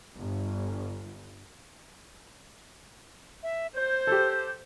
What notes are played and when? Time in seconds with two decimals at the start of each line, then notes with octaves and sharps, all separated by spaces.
0.17 G1
3.43 E5
3.76 C5 G6
4.07 G4 A4